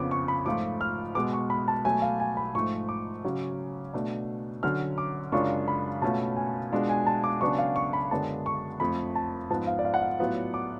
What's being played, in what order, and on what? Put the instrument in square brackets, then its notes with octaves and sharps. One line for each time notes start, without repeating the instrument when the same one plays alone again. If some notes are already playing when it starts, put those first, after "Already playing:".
Already playing: [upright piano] F2 C#3 F3 B3 [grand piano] D6
[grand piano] C#6
B5
[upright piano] G#2 F3 A3 F4 [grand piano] D6
[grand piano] F6
[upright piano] B2 G#3 B3 [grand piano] D6
[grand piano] C#6
B5
A5
[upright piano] B2 F#3 A3 [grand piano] G#5
[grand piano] F5
G#5
B5
[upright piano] G#2 F3 A3 [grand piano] C#6
[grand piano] D6
[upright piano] C#3 F#3 C#4
B2 A3 D4
[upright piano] D3 F#3 C#4 [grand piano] F6
[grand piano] D6
[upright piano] F#2 C#3 G#3 D4 F4 [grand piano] C#6
[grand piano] B5
[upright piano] B2 A3 C#4 F4 [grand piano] A5
[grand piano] G#5
[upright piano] B2 G#3 D4 F4
[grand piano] G#5
A5
D6
[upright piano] C#3 F#3 B3 D4 [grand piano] C#6
[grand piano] F5
C#6
B5
[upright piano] F#2 D3 G#3 B3 D4 [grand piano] A5
[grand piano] C#6
[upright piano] F2 F3 A3 F4 [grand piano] B5
[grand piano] A5
[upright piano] G#2 F3 B3 [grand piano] A5
[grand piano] F5
D5
F5
F#5
F5
[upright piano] A2 F#3 B3 F4
[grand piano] D6